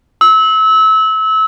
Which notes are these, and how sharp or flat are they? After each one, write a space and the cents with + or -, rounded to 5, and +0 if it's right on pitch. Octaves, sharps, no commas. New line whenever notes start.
E6 -30